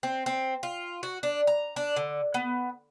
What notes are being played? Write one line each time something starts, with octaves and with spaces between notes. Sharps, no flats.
C4
C4
F4
F#4
D4
A#5
D4
D3
B3